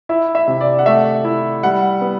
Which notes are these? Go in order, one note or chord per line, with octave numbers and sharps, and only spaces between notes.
E4 E5
E5
C3
D5
F#5
A3 E5
E4
G3 F#5
B3